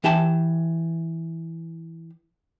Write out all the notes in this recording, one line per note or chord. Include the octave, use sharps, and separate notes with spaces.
E3 G4 E5 A5